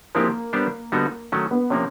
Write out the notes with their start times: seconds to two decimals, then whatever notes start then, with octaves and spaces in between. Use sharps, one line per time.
0.15 F3 G#3 A#3 C4 E4 G4
0.53 G3 B3 D4 G4 C5
0.92 D3 G3 B3 D#4 F#4
1.32 D#3 F#3 A3 C#4
1.51 B3
1.70 C3 F3 A#3 C#4